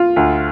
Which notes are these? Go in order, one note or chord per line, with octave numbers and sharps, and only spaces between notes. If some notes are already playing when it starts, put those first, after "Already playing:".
Already playing: F4
D2